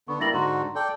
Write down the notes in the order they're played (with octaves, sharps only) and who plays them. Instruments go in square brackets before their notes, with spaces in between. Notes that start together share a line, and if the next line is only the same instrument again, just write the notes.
[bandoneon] D3 B3 [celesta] C#6
[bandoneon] G3 A#3 E4 [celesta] A6 A#6 F#7
[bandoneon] G#2 D3 F#4 [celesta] A#5 C6
[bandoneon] A4 D5 G5